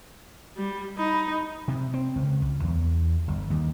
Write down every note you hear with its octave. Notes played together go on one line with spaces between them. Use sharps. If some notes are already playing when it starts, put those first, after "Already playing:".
G3
D#4 B5
C3
C4
C#2
C#2
E2
G1
D#2